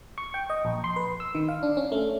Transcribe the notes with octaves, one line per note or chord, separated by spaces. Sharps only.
C#6
G5
D#5
A#1
C6
B4
E6
D#3
F5
D4
C#4
A3